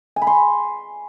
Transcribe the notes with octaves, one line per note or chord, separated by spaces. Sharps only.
G#5
B5
C6